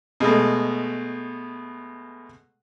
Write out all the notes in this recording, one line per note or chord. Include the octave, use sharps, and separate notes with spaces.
B2 G#3 A3